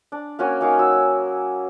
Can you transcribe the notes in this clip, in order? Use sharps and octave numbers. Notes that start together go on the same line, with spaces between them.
D4
A#3 C#4 F#4 G#5
A#3 D#4 F#4 F5
F#3 E6